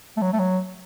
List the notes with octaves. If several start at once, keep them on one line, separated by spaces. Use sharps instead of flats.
A3
F#3
A3
F#3